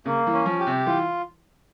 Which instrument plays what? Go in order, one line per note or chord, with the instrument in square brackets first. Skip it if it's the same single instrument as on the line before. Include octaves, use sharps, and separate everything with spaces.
[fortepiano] C#3 [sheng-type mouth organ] A#3
[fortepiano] E3
[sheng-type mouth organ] C#4
[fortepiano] F3
[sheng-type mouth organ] G4
[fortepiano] C3
[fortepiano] E3 [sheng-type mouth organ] F4